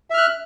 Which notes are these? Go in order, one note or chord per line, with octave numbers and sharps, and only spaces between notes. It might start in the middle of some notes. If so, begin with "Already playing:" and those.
E5 F6 F#6